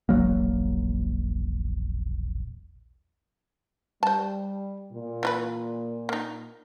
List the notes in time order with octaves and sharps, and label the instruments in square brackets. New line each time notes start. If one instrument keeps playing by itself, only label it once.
[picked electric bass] E1 A#1 F#3 A#3
[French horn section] G3 [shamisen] C5 A5
[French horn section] A#2
[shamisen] E3 F4 B4
A#3 D#4